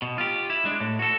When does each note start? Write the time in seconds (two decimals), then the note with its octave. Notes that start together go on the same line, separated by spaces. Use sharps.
0.02 B2
0.18 F4 G4
0.50 E4
0.65 G#3 D4
0.81 A2
0.99 F#4 A4